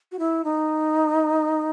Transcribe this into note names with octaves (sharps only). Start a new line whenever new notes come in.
F#4
E4
D#4